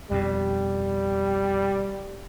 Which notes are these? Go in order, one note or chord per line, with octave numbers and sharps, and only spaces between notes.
F2 B2 G3